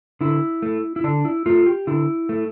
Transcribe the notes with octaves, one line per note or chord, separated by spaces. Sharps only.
D3 E4
A3
E4
D3 D4
E4
A3 F4
G4
D3 E4
A3